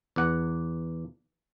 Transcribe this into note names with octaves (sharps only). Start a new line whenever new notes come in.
E2 F#5